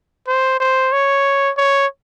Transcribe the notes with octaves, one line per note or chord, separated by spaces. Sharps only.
C5
C5
C#5
C#5